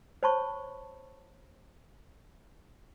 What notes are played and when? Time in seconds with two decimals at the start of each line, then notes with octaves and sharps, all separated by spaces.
0.23 C5 C#5 A5 B5 C#6